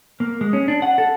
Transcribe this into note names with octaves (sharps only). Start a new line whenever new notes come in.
A#3
G#3
C#4
D4
F#5
A4